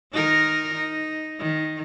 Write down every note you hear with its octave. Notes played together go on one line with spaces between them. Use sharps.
D#3 D#4 A#4
D#4
D#3